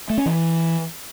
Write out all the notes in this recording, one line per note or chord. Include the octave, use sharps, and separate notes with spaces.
A3
C#4
E3